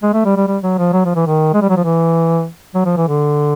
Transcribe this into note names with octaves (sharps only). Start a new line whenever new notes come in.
G#3
A3
G3
G3
G3
F#3
F3
F#3
F3
E3
D#3
G#3
G3
F#3
F3
E3
F#3
F3
E3
D3